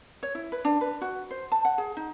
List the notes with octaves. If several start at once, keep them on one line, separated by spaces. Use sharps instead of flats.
C#5
E4
B4
D4
B4
F#4
C5
A5
F#5
G#4
D#4